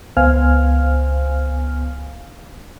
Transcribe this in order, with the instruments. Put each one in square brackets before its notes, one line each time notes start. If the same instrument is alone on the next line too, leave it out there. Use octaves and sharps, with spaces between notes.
[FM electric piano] C#2 B3 C5 F5 G#5 F6